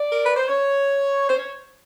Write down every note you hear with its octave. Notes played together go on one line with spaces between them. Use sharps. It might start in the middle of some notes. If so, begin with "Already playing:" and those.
Already playing: D5
A#4
B4
C5
C#5
C5
C#5